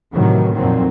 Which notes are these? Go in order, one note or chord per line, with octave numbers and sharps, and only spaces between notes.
A2 C3 D#3 E3 F#3
F2 A#2 D3 D#3 F#3 C4